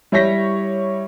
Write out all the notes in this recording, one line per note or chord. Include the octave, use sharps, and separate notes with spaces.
G3 E4 C#5 G6 A#6 B6